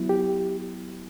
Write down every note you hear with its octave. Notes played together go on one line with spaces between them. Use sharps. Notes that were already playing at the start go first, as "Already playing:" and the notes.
Already playing: F#3 B3 E4
G4